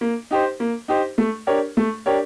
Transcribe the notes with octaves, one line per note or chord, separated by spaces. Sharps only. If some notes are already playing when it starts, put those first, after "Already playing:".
A#3
D#4 G4 C5
A#3
D#4 G4 C5
A3
D4 G4 A#4 C#5
A3
D4 G4 A#4 C#5